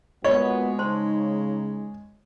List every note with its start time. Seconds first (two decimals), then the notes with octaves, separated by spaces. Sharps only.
0.24 A#2 G#3 B3 F#4 C#5 D#5 B5 C#6
0.79 C#3 D#4 C5 A5 C6